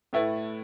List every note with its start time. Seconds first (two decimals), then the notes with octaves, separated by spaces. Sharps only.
0.13 A2 A3 E4 B4